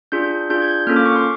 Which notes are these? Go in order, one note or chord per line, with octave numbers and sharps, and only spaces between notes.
D4 F4 G#4 G6
D4 F4 G#4 G6
G#6
G6
A#3 C#4 F4 A4 F6
D6
C#6
C6